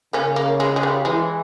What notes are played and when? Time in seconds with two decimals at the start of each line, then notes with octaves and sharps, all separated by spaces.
0.13 C#3 A#3 C#4
0.36 A#3
0.60 G#3
0.76 G#3
0.83 G3
1.05 E3 G#3